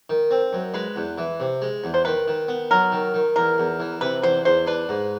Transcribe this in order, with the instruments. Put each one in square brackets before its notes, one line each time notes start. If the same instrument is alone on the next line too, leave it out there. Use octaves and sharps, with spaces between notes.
[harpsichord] D#3
C4
F#2
[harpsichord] G#3 [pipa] B4
[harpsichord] E2
E3
C3
G#3
E2
[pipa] C5
[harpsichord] D#3 [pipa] B4
[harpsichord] D#3
B3
[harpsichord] F#3 [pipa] A#4
[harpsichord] D#3
D#3
[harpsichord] E2 [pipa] A#4
[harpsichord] E2
E3
[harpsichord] C3 [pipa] B4
[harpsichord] E2 [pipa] C5
[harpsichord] E2 [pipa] C5
[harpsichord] D4 [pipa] B4
[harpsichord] G#2